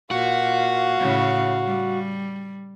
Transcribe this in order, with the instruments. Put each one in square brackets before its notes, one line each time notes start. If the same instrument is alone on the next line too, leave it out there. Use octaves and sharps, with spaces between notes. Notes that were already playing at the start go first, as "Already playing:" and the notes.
[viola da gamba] A#2 [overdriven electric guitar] F#4 [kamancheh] F5
[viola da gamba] A2 C#3
G3